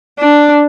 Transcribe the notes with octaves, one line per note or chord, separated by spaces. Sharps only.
D4